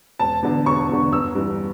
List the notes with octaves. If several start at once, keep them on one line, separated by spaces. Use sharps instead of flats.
E1 A5
E2 D3
E1 C#6
E2 D3
G1 E6
G2 E3